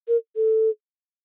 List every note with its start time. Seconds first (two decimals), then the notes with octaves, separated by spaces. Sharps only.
0.08 A#4
0.36 A4